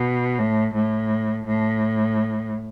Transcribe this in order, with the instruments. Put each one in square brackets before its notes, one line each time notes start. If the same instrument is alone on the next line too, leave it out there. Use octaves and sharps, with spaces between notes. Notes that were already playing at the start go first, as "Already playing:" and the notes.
Already playing: [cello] B2
A2
A2
A2